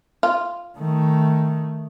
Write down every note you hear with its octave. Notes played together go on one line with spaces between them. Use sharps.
F4
D#3 A3